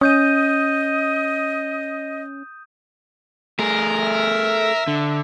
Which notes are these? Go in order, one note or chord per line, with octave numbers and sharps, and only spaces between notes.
C#4 D#5 D#6 G6 D#7
A3 G#4 A#4
E5
D3